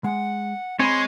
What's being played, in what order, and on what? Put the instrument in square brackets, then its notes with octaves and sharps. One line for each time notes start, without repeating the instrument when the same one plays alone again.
[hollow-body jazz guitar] G#3 [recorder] F#5
[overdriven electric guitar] G#3 [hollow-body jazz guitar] C4 B5 [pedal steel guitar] C#5 G#5 [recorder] C6